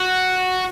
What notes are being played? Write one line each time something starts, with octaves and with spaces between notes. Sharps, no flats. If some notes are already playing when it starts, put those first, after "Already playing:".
Already playing: F#4